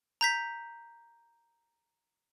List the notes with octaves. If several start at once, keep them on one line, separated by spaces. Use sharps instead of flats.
A#5 G6 B6